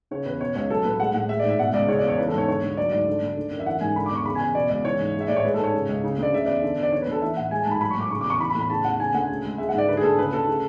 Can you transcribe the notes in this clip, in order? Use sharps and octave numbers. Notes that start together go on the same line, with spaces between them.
C#3 C#5
E2 B4
B2 C#5
C#2 C#5
F#3 A4
A2 B4
G#3 F#5
A2 F#5
G#3 E5
D5
G#2 E5
B2 F#5
C#2 D5
C#3 C#5
D5
E2 C#5
E3 B4
A4
G#2 C#5
D3 C#5
D2
F#3 D5
G#2 D5
D3
D2
D3
F#2
E5
E3 F#5
G#2 G#5
D3 B5
D6
E2 C#6
C#3 B5
G#5
E2
B2 D5
C#2 D5
E3 C#5
G#2
G#3
E5
A2 D5
C#5
G#3 B4
A4
G#2 C#5
C#3
C#2
C#3
D2
D5
C#3 E5
E2 D5
D3
E2
D5
D3 C#5
B4
D2 A4
E3 E5
A2 F#5
G#3 G#5
A5
G#2 B5
F#3 B5
C#6
A2 D6
C#3 C#6
D6
E2 C#6
E3 B5
B5
A2
B5
C#3 A5
E2 F#5
C#3 G#5
D2 F#5
C#3
C#2
G#3 E5
F#5
G#2 D5
D3 B4
G#4
D2 A4
C#3 B4
D2 A4
C#3